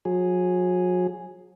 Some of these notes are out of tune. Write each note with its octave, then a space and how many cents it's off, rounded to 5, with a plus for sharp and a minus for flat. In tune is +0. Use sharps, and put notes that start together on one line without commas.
F#3 -40 G#4 +0